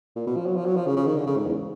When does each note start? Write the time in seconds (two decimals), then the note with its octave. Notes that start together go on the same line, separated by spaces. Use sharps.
0.16 A#2
0.27 B2
0.36 F3
0.46 F#3
0.56 F3
0.66 F#3
0.76 F3
0.87 C#3
0.97 C#3
1.06 D#3
1.16 D3
1.27 C#3
1.37 G#2
1.46 E2